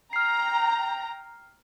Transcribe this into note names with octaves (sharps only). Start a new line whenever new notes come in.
G5 A#5 F6 C7